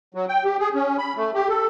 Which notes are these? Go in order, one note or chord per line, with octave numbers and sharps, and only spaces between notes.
F#3
G5
G4
G#4
C#4
B5
A3
G4
A4